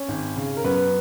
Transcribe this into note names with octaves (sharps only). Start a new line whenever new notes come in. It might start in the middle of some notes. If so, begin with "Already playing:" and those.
Already playing: C#4 C#5
G#1
C#3
A#4
F#2 B3 B4